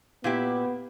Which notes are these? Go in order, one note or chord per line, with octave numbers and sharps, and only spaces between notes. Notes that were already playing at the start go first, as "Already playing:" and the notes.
A#2 B3 E4 G4